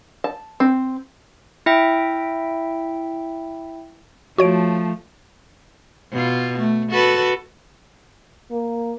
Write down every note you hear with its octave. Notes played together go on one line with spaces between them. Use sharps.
A5
C4
E4 E5 G5
F3 A3 F#4 C#5 D7
B2 F4
A3
F#4 A4 B4
A#3